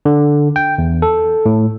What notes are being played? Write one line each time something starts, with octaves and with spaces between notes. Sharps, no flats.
D3
G5
E2
A4
A2